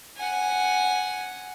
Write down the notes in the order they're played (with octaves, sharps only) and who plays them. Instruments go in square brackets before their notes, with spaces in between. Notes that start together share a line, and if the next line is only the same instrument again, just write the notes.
[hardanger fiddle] F#5 G#5